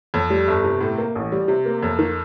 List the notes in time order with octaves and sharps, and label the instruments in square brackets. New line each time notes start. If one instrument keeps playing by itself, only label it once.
[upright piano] F2
G3
G1
C3
A2
A#3
A1
G3
C3
A#3
F2
D#3